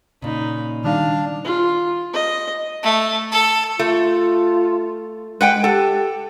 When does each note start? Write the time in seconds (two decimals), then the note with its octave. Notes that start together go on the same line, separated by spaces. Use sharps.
0.22 A#2 C#3 D#4 B5
0.84 D#3 G3 D4 D#4 F5
1.45 F4
2.13 D#5
2.83 A3
3.32 A4
3.79 A3 F4
5.41 G#3 B4 F#5 G5
5.64 G4 A4